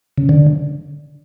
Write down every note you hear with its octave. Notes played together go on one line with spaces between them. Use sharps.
C#3
D3